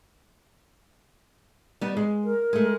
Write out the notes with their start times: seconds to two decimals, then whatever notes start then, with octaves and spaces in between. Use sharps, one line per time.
1.81 G3 B3 D#4
1.97 G#3
2.25 A#4
2.53 G#3 A3